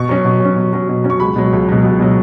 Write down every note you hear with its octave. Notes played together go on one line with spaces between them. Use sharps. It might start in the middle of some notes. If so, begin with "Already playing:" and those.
Already playing: B2 C#6
F#3 C#4
B2
F#3 C#4
B2
F#3 C#4
B2
F#3 C#4
C#6
C#2 B5
B2 F#3
C#2
B2 F#3
C#2
B2 F#3